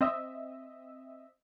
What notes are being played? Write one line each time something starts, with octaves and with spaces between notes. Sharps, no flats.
C4 D#5 E5